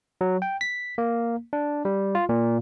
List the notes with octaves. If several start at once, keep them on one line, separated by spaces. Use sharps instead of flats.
F#3
G5
B6
A#3
D4
G3
F4
A#2